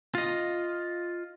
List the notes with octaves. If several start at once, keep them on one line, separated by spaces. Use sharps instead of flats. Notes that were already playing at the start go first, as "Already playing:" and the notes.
F4 D#5